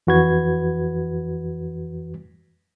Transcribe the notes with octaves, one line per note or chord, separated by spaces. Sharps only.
F2 E3 F#4 B4 G#6